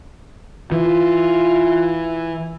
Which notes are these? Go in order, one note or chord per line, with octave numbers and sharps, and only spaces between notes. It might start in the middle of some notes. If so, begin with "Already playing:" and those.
E3 F4